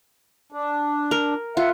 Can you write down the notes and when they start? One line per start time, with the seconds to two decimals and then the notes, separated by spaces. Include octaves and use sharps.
0.52 D4
1.11 A#4
1.57 F4 E5 F#5